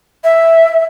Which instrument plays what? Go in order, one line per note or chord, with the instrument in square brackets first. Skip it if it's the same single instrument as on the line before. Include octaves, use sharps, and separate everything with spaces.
[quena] E5